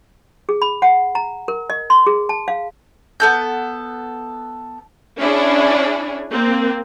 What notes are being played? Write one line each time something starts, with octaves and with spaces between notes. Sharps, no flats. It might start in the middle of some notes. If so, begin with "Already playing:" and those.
G#4
B5
F#5
A#5
A#4
D#5
C6
G#4
A5
F5
B3 A4 G6
C#4 D4 E4 G#4
A#3 C4